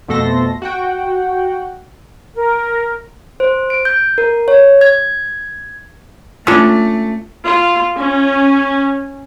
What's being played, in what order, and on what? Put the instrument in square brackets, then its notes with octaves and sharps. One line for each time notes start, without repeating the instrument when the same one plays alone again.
[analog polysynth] F2 B2 A3 A4 C6 A#6
F#4 F#5 G5
[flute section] A#4
[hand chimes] C5
D7
G6
A#4
C#5
G#6
[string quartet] A3 [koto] C#4 D4 [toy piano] F4 D#6
[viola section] F4
C#4